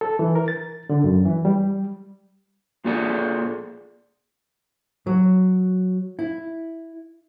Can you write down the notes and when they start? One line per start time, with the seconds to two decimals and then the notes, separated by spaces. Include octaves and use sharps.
0.01 A4
0.19 E3
0.35 A#4
0.48 A6
0.90 D3
1.04 F#2
1.25 E3
1.45 G3
2.85 A#2 A#3 F4 G#4 A4 D5
5.07 F#3
6.19 E4